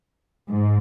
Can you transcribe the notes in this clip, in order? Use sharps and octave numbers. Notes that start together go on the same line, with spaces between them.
G#2